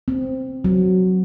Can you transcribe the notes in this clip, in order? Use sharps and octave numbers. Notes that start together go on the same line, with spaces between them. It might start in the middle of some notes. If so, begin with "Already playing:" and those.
C4
F#3